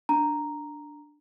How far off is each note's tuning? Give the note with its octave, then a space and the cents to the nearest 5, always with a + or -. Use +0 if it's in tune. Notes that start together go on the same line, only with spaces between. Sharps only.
D4 +0 A#5 +0